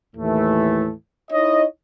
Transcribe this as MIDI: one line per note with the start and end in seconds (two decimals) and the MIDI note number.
0.16 0.91 39
0.16 0.91 45
0.16 0.91 52
0.16 0.91 57
1.31 1.64 63
1.31 1.64 64
1.31 1.64 73
1.31 1.64 75